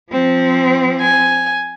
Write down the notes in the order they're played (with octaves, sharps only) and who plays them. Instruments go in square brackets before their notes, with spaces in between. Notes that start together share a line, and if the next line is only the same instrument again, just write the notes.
[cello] F3 C4
[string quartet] G#5